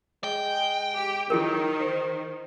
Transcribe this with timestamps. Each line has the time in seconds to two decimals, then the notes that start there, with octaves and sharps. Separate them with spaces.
0.24 G#3 G5
0.94 G4
1.30 D#3 F#3 E4 G#4 A#4
1.80 C5